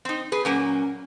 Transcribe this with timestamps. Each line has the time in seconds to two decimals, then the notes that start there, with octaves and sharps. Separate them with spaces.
0.05 C4 D#4
0.32 G#4 B4
0.45 A#2 F#3 A#3 C#4